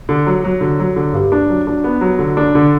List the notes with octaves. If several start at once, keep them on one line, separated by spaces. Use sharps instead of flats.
D3
F#3
F#3
D3
F#3
D3
G2
D4
F#3
D4
B3
F#3
D3
D4
D3